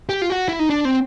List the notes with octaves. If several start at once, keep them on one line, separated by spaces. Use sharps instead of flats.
G4
F4
F#4
E4
D#4
D4
C4